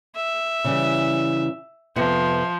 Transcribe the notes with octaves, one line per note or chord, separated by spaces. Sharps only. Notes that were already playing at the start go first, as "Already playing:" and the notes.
E5
C#3 E3 G3
F2 C3 F3 B3